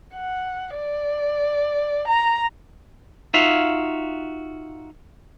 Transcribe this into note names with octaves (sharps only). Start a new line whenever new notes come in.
F#5
D5
A#5
D#4 F4 F#4 E5 F5